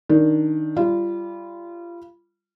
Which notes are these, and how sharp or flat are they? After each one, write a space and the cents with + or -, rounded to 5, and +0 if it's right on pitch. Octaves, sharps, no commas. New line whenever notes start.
D#3 +0 D4 +0
G3 +0 F4 -30